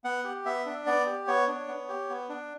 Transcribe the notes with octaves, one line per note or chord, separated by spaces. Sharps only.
B3 F#5
G4
B3 E5
D4
B3 D5
G4
B3 C#5
D4
B3
G4
B3
D4